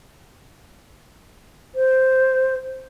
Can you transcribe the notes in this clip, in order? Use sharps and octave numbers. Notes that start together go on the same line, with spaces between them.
C5